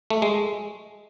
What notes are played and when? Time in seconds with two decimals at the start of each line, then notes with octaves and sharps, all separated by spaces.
0.10 A3
0.22 G#3